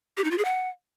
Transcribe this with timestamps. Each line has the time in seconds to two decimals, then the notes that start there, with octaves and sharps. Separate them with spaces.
0.17 G4
0.24 D#4
0.31 F4
0.38 G#4
0.45 F#5